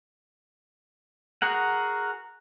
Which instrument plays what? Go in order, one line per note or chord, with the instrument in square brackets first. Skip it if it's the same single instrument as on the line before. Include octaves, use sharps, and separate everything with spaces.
[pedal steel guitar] F#4 G#4 A#4 F#5